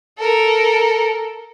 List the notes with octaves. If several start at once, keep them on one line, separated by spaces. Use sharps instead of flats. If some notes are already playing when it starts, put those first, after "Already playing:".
A4 A#4